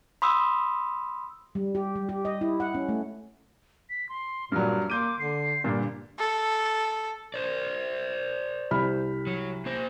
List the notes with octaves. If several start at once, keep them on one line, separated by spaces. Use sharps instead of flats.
B5 C6 D#6 E6
G3
G4
G3
G4
D#5
E4
F#5
C#4
A3
B6
C6
G2 A#2 F#3 F6
A#3 C6 D6 G6 D#7
D3 C7
G2 A#2 D3 A#3
A4
C5 D5
C2 B5 F6
F#3
A#3 C5